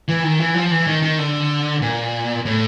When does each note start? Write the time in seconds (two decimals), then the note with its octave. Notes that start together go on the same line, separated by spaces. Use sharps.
0.08 E3
0.24 D#3
0.40 E3
0.55 F3
0.71 E3
0.87 D#3
1.02 D#3
1.19 D3
1.82 A#2
2.46 A2